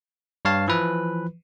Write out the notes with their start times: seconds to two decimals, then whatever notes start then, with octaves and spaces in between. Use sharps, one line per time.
0.45 G2 C#5 F5 A5
0.68 E3 F3 B4